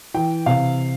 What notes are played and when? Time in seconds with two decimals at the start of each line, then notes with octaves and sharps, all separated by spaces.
0.14 E3 G5
0.46 C3 F5